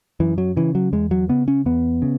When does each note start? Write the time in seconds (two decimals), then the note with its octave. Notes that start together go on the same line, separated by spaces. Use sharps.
0.20 F#2 E3
0.38 F#3
0.56 C#3 E3
0.75 F#3
0.93 E2 G#3
1.11 F#3
1.29 C#3 B3
1.48 C#4
1.66 E2 B3
2.02 C#3